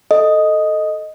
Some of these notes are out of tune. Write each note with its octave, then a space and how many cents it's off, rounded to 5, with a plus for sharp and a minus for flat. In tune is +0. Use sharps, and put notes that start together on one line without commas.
A4 +0 D#5 +0